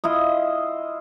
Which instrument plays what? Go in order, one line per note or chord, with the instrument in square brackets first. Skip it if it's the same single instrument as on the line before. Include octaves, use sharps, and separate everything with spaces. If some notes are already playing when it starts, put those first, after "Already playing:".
[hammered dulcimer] E4 F4 D#5